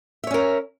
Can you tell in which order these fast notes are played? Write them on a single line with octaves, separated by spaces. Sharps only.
E5 C#5 C#4 A#4